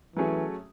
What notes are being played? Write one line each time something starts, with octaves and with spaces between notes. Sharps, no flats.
E3 F#3 A3 C#4 G#4